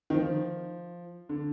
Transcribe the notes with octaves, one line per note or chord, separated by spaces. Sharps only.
D#3
F3
D3